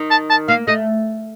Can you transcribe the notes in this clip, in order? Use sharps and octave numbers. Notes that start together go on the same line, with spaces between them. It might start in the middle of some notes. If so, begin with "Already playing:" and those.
Already playing: D#3
A5
A5
A#3 F5
A3 D#5